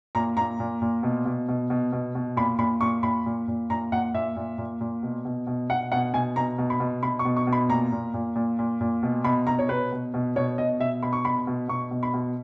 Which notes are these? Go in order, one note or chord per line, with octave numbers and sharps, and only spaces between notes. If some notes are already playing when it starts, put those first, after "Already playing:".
A#2 A#5
A#2 A#5
A#2
A#2
B2
B2
B2
B2
B2
B2
A#2 B5
A#2 B5
A#2 C#6
A#2 B5
A#2
A#2
A#2 A#5
A#2 F#5
A#2 E5
A#2
A#2
A#2
B2
B2
B2
B2 F#5
B2 F#5
B2 G#5
B2 A#5
B2
B5
B2
B2 B5
C#6
B2
C#6
B2
B5
A#2 A#5
A#2
A#2
A#2
A#2
A#2
B2
B2 B5
B2 A#5
C#5
B2 B4
B2
B2
B2 C#5
B2 D#5
B2 E5
B2 B5
C#6
B2 B5
B2
B2 C#6
B2
B5
B2